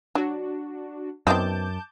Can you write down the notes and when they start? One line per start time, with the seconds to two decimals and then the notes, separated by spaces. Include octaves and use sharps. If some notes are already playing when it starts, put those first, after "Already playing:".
0.15 F#3 D4 F#4
1.27 F#2 B3 C4 D#4 A5 D6 G6